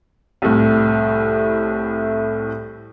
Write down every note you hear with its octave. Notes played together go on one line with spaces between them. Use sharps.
C2 A2